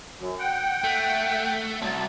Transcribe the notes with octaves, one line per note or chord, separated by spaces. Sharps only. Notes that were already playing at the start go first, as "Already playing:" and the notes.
F#2
F#5 G5
A3
C2 F#3 A5